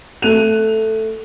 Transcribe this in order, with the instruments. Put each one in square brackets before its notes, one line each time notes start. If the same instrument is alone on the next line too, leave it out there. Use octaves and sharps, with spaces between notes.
[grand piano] A3 F#6 D#7 F7